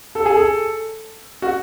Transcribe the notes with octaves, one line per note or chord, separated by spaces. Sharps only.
A4
G#4
A4
F#4